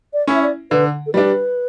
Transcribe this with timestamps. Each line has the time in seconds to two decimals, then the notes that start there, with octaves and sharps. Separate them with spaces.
0.13 D5
0.27 C#4 E4
0.35 E5
0.42 D5
0.71 D3 B4
1.07 A4
1.14 G3 D4 B4